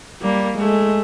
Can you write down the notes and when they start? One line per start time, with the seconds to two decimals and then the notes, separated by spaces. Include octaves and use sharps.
0.22 G3 A#3
0.58 G#3 A3